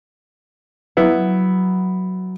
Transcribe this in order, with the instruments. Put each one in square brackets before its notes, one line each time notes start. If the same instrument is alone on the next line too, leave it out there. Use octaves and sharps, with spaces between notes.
[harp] F#3 [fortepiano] B3 E4